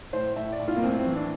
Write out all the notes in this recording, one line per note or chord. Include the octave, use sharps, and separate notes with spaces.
A2 C5
A2 E5
D5
A2
F4
A#3
A2 C4
C4
E3
D4